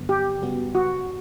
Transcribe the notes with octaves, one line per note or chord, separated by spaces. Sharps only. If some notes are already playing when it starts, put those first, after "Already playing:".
Already playing: G2 D3 F#3 B3
G4
F#2 C#3 G3 B3 F#4
F#4